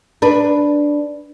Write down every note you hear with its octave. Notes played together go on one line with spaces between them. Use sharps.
D4 B4